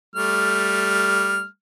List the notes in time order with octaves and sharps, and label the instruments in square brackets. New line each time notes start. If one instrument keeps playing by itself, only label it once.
[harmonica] G3 A3 F6